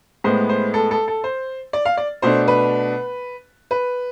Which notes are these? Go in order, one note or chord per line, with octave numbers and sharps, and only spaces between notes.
A2 G#3 B3 C5
C5
A4
A4
A4
C5
D5
F5
D5
B2 A3 D4 C5
B4
B4